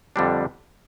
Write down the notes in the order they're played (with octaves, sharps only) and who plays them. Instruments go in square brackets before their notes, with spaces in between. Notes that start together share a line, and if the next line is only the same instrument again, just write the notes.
[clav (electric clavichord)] F2 D3 G3 D4